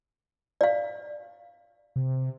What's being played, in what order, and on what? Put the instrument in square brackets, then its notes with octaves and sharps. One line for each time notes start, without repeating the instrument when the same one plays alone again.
[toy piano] D5 F5
[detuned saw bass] C3